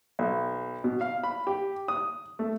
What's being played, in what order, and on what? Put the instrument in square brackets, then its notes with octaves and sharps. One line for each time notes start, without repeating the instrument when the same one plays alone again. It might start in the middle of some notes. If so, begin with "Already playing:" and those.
[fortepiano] B1
B2
F5
B5
G4
D#6
A3